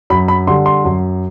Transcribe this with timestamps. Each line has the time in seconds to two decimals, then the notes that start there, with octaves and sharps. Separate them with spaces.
0.10 F#2 B5
0.28 B5
0.47 D3 G3 C6
0.66 C6
0.85 F#2